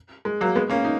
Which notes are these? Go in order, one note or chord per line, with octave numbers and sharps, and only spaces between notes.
G#3
F#3 A#3
G#3 B3
A#3 C#4
D#4